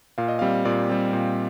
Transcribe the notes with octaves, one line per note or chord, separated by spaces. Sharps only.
A#2 F5
D#5
G3 C4 F5
A#2 D5
G3 C4
A#2